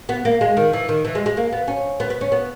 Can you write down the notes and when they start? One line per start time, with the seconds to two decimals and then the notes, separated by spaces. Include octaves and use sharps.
0.09 B3
0.25 A#3
0.41 G#3
0.57 D#3
0.73 E3
0.89 D#3
1.05 E3
1.15 G#3
1.26 G#3
1.37 A#3
1.52 B3
1.68 C#4
2.00 B3
2.10 B3
2.21 C#4
2.32 B3